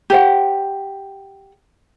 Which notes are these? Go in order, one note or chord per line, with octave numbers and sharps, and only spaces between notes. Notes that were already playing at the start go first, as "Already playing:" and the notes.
G4 C5 F#5